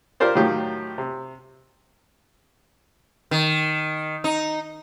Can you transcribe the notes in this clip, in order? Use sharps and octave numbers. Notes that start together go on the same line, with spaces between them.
F4 G4 A#4 C5 D5
A2 D#3 F#3 F4 G4
C3
D#3
D#4